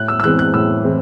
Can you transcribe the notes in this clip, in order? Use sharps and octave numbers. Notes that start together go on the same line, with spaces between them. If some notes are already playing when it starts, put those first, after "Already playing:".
Already playing: A2 F#6
E6
E6
E3 G#3 C4 F#6
F#6
A2 E6
E3 G#3 C4